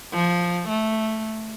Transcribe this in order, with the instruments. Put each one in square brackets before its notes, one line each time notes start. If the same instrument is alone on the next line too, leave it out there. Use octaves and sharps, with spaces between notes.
[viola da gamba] F3
A3